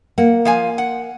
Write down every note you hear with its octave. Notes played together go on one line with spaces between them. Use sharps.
A#3 F#5
F3 F5 G#5
F#5